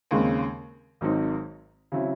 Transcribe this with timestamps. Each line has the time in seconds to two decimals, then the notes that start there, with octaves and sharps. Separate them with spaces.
0.11 D#2 C#3 G#3 C4
1.01 G#1 G#2 F#3 C4 D#4
1.92 C#3 F#3 C4 E4